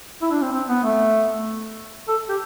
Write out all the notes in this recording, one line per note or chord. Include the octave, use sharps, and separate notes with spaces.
E4
D4
C4
C4
B3
A3
A4
G4